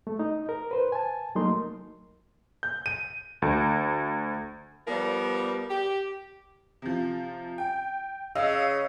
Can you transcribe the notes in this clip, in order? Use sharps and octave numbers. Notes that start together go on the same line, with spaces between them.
A3
D#4
A#4
B4 C5
G#5 A5
F#3 A3 A#3 D#4 A#4 C6
G6
D#7
D2
F3 G3 B3 A#4
G4
C3 F3
G5
C#3 D#5 F5 E6